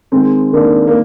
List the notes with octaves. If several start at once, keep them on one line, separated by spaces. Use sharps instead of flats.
D#3 G#3 C4
D#3 A#3 D4
A#3